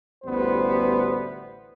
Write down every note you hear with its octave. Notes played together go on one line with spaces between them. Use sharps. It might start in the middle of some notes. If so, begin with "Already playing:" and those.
A1 D2 G3 B3 C5